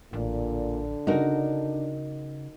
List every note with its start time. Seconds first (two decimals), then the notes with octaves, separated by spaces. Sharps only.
0.13 A1 A#2 D3
1.07 C#3 D4 D#4 F#4 A#4